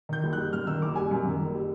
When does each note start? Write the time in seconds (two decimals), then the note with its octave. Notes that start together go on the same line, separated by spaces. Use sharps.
0.09 D#3 G6
0.23 F#1
0.33 G3 F#6
0.52 F#2 F6
0.67 D#3 E6
0.82 F#1 D6
0.96 G3 G#5
1.11 F#2
1.25 D#3
1.40 F#1
1.55 G3